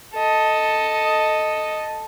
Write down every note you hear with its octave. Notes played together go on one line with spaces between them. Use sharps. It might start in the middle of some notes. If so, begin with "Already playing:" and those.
A4 D#5